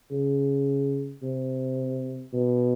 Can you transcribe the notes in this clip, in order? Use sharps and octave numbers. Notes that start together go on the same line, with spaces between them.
C#3
C3
B2